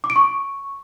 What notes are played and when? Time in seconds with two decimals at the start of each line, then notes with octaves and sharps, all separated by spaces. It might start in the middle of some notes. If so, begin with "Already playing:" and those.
0.04 D6
0.10 D7
0.16 C#6